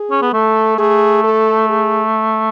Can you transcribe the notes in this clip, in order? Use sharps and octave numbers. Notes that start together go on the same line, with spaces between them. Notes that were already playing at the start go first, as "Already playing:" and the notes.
Already playing: G#4
C#4
B3
A3 A4
A3 G#4
A4
G#4